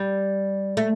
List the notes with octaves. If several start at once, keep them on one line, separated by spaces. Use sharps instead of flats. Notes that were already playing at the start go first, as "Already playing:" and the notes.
Already playing: G3
A3